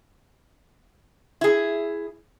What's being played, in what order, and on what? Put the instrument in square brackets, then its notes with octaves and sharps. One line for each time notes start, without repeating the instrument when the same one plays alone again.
[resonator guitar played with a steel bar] E4 G#4